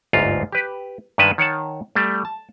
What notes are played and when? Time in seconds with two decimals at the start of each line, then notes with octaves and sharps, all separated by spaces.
0.13 G1 D2 G#2 F4 A#5
0.52 G4 B4
1.18 G2 D#3 G#3 B4 E5 A5
1.38 D#3 C#5 F#5 A5
1.95 G3 A3
2.25 A5